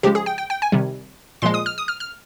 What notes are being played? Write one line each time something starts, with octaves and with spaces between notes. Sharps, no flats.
C#3 F3 G#3 G4
G#4
G5
G5
G5
G#5
C3 D#3 G3
A#2 F3 G#3 C6
D#6
F6
D#6
F6
F6